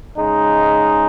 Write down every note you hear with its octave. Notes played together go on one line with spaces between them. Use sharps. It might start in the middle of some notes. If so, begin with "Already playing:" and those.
C#3 G#3 D#4